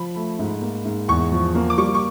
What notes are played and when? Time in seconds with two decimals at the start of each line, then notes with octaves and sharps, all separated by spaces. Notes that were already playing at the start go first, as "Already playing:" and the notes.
Already playing: F3 B5
0.16 A3
0.39 G#2
0.62 A#3
0.85 G#2
1.08 E2 C#6
1.32 F3
1.55 A#3
1.70 D6
1.78 G3 C#6
1.94 C#6